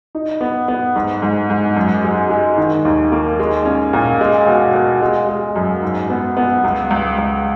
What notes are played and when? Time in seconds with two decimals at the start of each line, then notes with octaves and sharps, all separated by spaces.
0.15 D#4
0.41 B3
0.68 B3
0.96 G#2
1.22 G#2
1.50 G#2
1.76 F#2
2.04 G#3
2.30 G#3
2.57 D#3
2.85 D#2
3.12 A#3
3.39 G#3
3.65 C#4
3.93 A#2
4.21 G#3
4.47 B2
4.74 B2
5.02 G#3
5.29 G#3
5.56 F#2
5.83 G#2
6.10 B3
6.37 B3
6.64 C#2
6.91 C#2
7.18 C#2